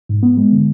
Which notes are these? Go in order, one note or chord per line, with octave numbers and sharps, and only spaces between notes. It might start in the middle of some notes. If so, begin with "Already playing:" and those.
G#2
B3
G#3
D3